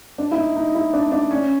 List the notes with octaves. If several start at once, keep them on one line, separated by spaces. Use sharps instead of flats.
D4
E4
D#4
D#4
E4
D4
D4
C#4